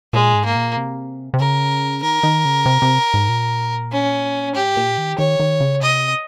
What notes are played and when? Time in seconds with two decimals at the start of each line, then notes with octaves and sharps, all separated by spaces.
0.13 A#2 G#3
0.34 G#2
0.45 A#3
0.56 A#2
0.77 C3
1.34 C3
1.40 C#3 A#4
2.03 D#3 A#4
2.23 D#3
2.45 C#3
2.66 C3
2.82 C3
3.14 G#2
3.29 A#2
3.92 C#4
4.55 G#2 G4
4.77 A#2
4.98 D#3
5.18 D#3 C#5
5.40 D#3
5.60 C#3
5.82 C3 D#5